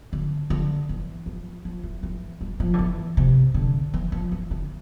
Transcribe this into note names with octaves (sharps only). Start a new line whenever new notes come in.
D3
D3
E3
F3
F3
E3
E3
G3
F3
D3
E3
C3
D3
E3
F3
E3
D3